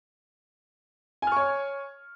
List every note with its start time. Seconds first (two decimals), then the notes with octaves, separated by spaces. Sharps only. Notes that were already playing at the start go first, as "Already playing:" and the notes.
1.22 G#5
1.27 F6
1.32 C#6
1.36 C#5